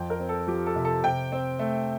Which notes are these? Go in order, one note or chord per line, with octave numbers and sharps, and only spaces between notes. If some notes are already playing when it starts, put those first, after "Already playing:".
Already playing: F2 G5
A#4
C4
A4
F3 G4
A4
C3
A4
C3 G5
C4
A3